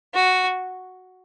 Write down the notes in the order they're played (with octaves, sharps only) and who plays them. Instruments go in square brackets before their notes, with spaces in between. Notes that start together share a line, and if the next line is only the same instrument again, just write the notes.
[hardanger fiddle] F#4